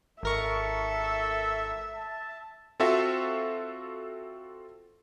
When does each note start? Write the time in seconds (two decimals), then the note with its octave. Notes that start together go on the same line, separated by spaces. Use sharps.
0.23 G#1 A4 A#4 E5 C#6
1.95 A5
2.80 C4 F4 F#4 A4 E5